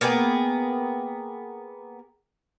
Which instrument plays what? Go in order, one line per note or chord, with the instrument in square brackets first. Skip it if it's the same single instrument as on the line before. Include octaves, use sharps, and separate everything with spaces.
[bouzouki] A#3 B3 G#4 G5